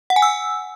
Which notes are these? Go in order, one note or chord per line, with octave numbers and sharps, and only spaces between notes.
F#5
G#5
E6